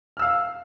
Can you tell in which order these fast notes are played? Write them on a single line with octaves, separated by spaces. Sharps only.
F6 E6 F5